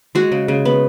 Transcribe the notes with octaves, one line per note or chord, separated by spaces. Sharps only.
G#3 F#4
C#3
C#3
B3